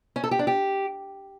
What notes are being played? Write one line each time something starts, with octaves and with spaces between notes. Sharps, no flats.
C#4
A4
G4
D4
G4